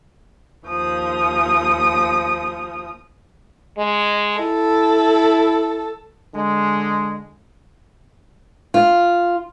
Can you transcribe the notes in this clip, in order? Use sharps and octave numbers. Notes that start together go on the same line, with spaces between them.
D#2 F3 D#6
G#3
E4 A4
D3 G#3
F4